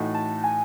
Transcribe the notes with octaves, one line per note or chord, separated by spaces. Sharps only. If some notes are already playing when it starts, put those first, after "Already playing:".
Already playing: A2 E3 A3 D#4 F#4
A5
G#5